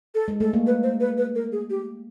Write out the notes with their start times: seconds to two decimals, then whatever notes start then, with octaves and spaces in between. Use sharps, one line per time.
0.15 A4
0.28 G#3
0.40 A3 A4
0.53 A#3
0.67 B4
0.83 C5
1.00 B4
1.18 B4
1.35 A#4
1.52 G#4
1.70 G4